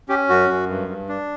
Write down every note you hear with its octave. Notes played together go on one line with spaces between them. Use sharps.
C#4 G4
F#2 F#4
F#2
G2
G2
D4